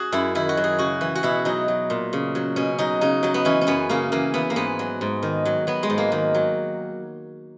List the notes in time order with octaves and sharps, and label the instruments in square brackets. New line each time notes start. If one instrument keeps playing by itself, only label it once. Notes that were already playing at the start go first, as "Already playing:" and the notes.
Already playing: [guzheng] F#4 G#4
F#2 E4
D#3 E4
F#4
F#3
G#4
C#3 F#4
E3
F#4
B2 E4
F#3 D#4
F#3
A#2
C#3
F#3
B2 C#4
F#3 D#4
C#3 D#4
F#3 D#4
B3
E3 C#4
C#4
F#2 B3
C#3 A#3
E3 A#3
E3 B3
A#3
G#2 B3
F#3
G#2
D#3
F#3
F#3 B3
G#3
G#2
A#3
D#3
F#3